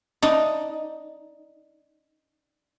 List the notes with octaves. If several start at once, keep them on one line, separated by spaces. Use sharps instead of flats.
D4 D#4